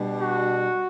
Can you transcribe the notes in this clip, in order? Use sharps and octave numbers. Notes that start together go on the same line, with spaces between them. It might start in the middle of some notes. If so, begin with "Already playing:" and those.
Already playing: B2 G3 D4
F#4